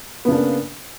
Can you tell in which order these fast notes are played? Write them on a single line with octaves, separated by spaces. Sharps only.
B3 C#3 D4 A#3